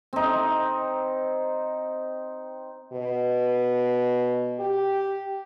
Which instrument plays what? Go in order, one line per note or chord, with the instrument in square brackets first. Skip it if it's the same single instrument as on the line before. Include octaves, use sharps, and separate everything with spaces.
[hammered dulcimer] C4 D#4
[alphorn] B2
G4